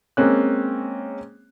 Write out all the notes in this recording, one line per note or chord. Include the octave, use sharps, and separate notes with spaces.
G#3 A#3 C4 C#4 F#6